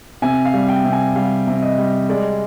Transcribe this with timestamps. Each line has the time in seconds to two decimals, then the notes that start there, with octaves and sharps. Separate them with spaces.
0.22 C3 G#5
0.45 F5
0.54 G3
0.69 G5
0.84 C3
0.93 G#5
1.15 G3 F5
1.47 C3
1.62 D#5
1.78 G3
2.09 G#3 D5